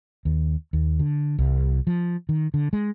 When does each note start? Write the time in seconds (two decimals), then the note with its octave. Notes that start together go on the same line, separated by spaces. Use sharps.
0.25 D#2
0.73 D#2
0.99 D3
1.39 C2
1.87 F3
2.29 D#3
2.54 D3
2.73 G#3